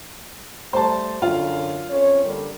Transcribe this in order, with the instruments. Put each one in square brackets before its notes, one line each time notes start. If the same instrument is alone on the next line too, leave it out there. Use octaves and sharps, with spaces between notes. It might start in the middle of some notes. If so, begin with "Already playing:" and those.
[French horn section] G3 A3 [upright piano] C5 A5
[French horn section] F#2 D3 [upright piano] F4
[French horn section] F2 C#4 C#5
D3 G3 A#3